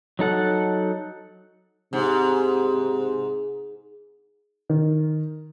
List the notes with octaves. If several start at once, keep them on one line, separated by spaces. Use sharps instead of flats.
F#3 D#4 A4 F#5
G#2 C3
D#3